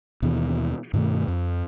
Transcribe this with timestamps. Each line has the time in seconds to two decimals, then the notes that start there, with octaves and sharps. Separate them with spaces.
0.22 D#2 B2 E3
0.93 G2 B2 D#3 A3
1.28 F2